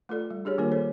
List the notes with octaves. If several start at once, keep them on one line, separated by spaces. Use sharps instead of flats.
A3 F4 A4 D5
G3
D4 G4 G#4 C#5
D#3 G3 A#3 D4 F4 A#4
A4 C5 C#5